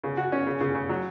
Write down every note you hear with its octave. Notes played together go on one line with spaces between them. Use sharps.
C#3
F#4
C#4
C#3
C#3
C#3
F#3